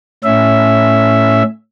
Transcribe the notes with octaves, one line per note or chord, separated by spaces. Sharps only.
A2 C#4 E5